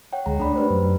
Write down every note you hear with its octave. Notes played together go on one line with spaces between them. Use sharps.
C#5 F#5 G5
D2 G#3 A#5
A3 D4 A#5 B5
G4 B4 C5
F#2